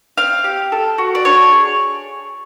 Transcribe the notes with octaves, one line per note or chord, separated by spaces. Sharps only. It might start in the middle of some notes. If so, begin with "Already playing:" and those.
C4 F5
G4
A4
F#4
D5
D4 C#5
G#4